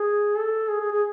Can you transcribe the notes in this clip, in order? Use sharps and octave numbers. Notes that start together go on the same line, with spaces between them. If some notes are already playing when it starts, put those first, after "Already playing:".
Already playing: G#4
A4
G#4
G#4
G#4